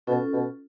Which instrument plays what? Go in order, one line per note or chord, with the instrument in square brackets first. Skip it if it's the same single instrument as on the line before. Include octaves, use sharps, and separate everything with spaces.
[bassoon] B2 [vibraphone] C#4 F4 A4
[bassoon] B2